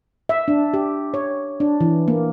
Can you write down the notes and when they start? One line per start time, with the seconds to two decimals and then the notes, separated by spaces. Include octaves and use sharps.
0.29 E5
0.48 D4
0.74 G4
1.14 C#5
1.60 D4
1.81 E3
2.08 A#3